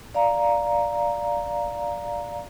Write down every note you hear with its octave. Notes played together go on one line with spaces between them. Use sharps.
D5 F5 A#5